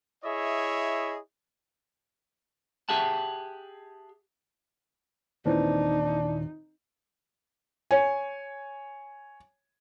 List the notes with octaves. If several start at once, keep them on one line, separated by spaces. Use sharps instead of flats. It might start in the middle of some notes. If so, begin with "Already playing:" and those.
E4 G#4 C#5 D#5 E5
G4 G#4 E5 F#5 A5
D#2 A#2 E3 C4 D4 D#4
C#5 G#5